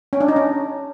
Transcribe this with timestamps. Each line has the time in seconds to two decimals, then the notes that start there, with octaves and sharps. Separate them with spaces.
0.13 C#4
0.21 D4
0.28 D#4
0.36 C#4